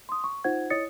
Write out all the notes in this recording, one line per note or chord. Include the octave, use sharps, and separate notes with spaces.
C6 D#6
C#6
D#4 F4 C5 F#5 G#6
E4 C#5 D#5 D#6 A6 C#7